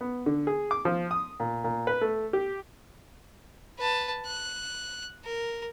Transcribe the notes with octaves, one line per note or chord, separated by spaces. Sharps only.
B3
D3
G#4
D6
F3
D#6
A#2
A#2
B4
A3
G4
B4 A5
F#6
A#4